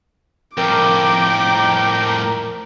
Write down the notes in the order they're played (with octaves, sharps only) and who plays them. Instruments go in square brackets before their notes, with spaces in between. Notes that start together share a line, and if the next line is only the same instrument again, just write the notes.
[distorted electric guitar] F2 A2 [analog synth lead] A#4 [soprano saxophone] G5 [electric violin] D6